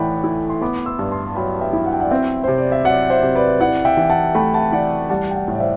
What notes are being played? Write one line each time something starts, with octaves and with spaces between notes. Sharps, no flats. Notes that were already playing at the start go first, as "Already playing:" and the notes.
Already playing: A2 E3 A3 D5 F#5 G5 B5
E4
C6
B3 B5 D6
C6 E6
G2
A5 C6
F#3 G5 B5
E5 G5
E4
F#5
G5
D5 F#5
C4 E5 G5
C3 C5
D5
E5
F#3 D5 F#5
C5 E5
C3
B4 D5
E4 D5 F#5
E5 G5
E3
F#5 A5
A3 G5 B5
F#5 A5
E3 D5 F#5
G3 F#5 A5
G5
D5 F#5
A2
D5
C5 E5